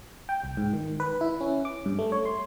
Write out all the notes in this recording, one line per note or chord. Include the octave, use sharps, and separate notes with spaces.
G5
C2
G#2
D#3
B4
E4
C#4
D6
G2
A3
C#5
C6